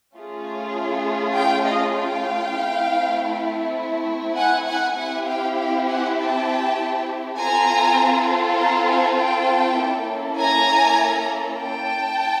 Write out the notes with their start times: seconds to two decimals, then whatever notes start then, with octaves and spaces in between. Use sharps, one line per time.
0.15 A3 C#4 F4 G#4
1.35 F5 G5
1.65 D#5 F5
1.95 F5 G5
2.56 A3 C4 E4
4.36 F#5 G#5
4.67 F#5 G#5
4.96 C4 E4 G4 F#5 G#5
5.26 F5 G5
5.56 F5 G5
5.87 F#5 G#5
6.17 G5 A5
7.37 C4 F4 A4 G#5 A#5
8.57 A#5 C6
8.87 G#5 A#5
9.17 G5 A5
9.78 A#3 C#4 E4 A4
10.38 G#5 A#5
11.58 G5 A5